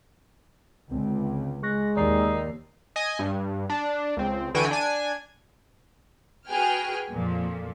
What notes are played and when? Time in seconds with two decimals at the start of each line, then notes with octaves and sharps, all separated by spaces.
0.91 C#2 D3 C4
1.63 G#3 C#6 F#6 A#6
1.96 D#2 D#4 D5 C7
2.96 D#5 G#5
3.19 G2
3.70 D4
4.17 C#2 C4
4.54 D3 E3 F#4 G5 G#5
4.71 D4 G#5
6.48 F#4 G#4 B4 G5 G#5 F6
7.11 F2 A#2 F3